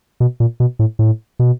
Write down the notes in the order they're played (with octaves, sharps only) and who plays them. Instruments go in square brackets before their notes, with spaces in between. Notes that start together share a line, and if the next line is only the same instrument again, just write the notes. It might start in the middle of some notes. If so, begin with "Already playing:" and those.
[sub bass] B2
A#2
B2
A2
A2
B2